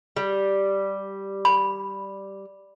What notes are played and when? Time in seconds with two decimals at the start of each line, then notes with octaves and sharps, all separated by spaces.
0.16 G3
1.45 B5